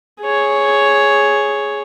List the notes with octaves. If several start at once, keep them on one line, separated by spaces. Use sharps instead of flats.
G#4 C#5